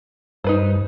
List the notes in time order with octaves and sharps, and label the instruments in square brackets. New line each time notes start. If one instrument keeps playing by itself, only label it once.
[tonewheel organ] G2 [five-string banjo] D#4 B4 C5